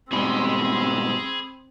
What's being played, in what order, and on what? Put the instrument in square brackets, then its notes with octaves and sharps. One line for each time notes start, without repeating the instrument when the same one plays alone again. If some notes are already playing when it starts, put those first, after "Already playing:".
[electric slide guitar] G#2 B2 G3 [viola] C4 [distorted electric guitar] G#4 C6 [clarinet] B5